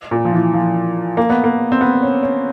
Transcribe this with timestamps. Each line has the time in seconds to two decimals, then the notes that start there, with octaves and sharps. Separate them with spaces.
0.11 A#2
0.25 F3
0.33 E3
0.54 F3
1.17 A#3
1.30 B3
1.44 A#3
1.72 C4
1.81 B3
2.02 C#4
2.23 C#4